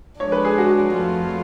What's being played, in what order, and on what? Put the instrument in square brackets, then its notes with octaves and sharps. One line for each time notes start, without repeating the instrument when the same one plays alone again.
[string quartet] F3 G#3 D4 [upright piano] C#5
[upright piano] B4
G#4
F#4
[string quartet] F2 F3 A3 F4